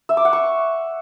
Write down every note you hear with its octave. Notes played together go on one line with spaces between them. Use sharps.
E5
D6
F#5
C#6